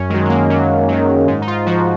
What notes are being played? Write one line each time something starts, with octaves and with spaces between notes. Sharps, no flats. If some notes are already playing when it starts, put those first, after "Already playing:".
Already playing: F#2 C#4
D#3 F#3 G#3
G#3
A#3
F#2 F#3
D#3 F#3
G#2 G#3
D#4
F4
F3 F#4